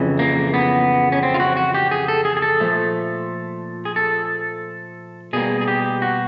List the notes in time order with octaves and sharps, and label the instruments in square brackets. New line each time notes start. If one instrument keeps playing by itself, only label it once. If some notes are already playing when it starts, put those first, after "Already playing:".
Already playing: [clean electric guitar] F2 C#3 E3
A#3
B3
C#4
C4
F4
F#4
F#4
G4
G#4
A4
G#4
G#4
A4
A#2 F3 A3
G#4
A4
B2 G3 A#3 G#4
G#4
G4
F#4